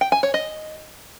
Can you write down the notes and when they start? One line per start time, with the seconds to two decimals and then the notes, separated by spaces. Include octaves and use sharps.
0.01 G5
0.12 G#5
0.23 C#5
0.34 D#5